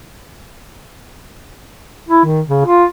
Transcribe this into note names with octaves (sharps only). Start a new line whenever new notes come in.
E4
D#3
C#3
F4